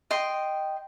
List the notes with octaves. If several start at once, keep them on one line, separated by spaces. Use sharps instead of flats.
D#5 G5 C6